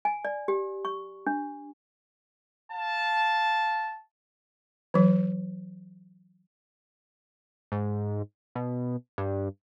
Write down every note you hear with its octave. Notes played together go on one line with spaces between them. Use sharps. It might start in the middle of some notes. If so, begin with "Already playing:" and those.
G#5
D5
G4
C#6
D4
F5 A5
E3 F#3
G#2
B2
G2